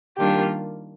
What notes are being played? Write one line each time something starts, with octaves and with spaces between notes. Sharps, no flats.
D#3 G3 A#3 D4 F4 G4